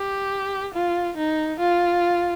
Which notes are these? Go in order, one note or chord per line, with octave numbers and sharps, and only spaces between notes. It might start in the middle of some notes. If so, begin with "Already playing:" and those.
Already playing: G4
F4
D#4
F4